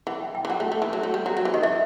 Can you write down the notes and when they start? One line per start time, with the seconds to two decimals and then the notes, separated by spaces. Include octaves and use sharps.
0.07 E3 F#5
0.20 G5
0.35 G5
0.45 E3
0.50 F#3 F#5
0.60 A3
0.72 A3
0.82 E3
0.93 F#3
1.03 A3
1.14 G3
1.26 F#3
1.37 F#3
1.45 E3 C5
1.54 D#3 D#5
1.63 E3 E5